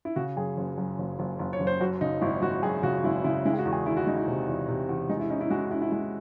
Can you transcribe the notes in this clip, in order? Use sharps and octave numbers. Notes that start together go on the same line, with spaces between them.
E4
C#3 F#4
F#2 G#4
F#1
F#2
F#1
F#1
F#1
C#5
F#1
C5
F#2 F#4
C#3 D#4
G#1 E4
G#1 F#4
F#2 G#4
C#3 F#4
G#1 E4
C#3 E4
G#3 E4
G#4
F#4
E2
G#4
D#3 E4
F#4
G#3 D#4
E4
C3
E2
C3
E2
G#3 D#4
E4
C#4 D#4
E4
G#3 F#4
C#4 E4
E4
G#3 E4